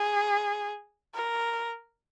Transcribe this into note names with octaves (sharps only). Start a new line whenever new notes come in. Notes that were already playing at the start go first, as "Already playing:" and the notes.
Already playing: G#4
A#4